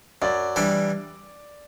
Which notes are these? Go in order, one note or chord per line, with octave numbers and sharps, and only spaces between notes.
F#2 D5
E3 G3 D4